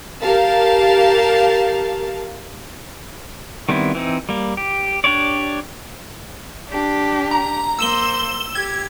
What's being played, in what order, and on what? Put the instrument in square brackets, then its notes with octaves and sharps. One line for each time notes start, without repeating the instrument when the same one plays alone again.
[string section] G4 A#4 F5 A5
[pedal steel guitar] D#3 G3 B3 C4 E4
E3 C4 D#4
G3 A#3
G4
D4 G4 C#5 D5
[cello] D4 G4
[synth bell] A#5
[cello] A#3 C5 [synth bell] E6 E7 G7
[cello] G4 [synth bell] G#6